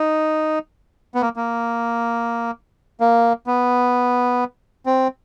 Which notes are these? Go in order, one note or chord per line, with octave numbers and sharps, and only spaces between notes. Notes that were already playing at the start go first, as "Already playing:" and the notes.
Already playing: D#4
B3
A#3
A#3
A#3
B3
C4